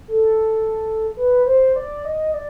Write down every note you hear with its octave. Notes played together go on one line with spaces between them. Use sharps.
A4
B4
C5
D5
D#5
D5